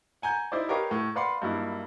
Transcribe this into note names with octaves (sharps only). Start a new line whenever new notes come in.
F#5 G#5 A#5 G6
D#4 E4 C5 D5
G4 A#4 B4 C#5 D#5 F5
A2
B4 D5 F5 F#5 B5 C6
G2 F#3 A#3 D#4 E4